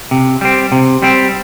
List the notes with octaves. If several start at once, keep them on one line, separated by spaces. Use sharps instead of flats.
C3
G3 C4
C3
G3 C4